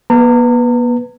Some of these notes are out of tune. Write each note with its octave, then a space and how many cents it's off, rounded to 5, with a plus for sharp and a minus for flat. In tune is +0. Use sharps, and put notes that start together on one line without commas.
B3 -45 B4 +0 A#5 -40